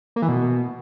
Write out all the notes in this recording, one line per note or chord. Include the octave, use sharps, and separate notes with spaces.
A#3
E3
B2